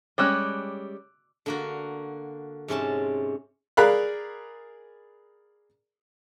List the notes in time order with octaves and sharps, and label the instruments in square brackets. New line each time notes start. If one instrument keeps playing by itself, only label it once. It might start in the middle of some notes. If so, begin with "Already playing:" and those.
[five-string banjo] G3 G#3 C#4 [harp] D6 E6 F#6
[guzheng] D3 A#3 F#4
G#2 C3 C#4 A5
[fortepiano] G#4 A#4 D5 F5 B5 F#6